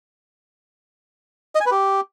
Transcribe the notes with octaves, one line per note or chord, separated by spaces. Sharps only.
D#5
G#5
B4
G4